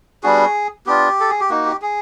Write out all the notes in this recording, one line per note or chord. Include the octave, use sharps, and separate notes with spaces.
G3 B3 D4 F#4 G#4
B3 D4 F4 G4
A4
G#4
G4
A#3 D#4 F#4
G4
G#4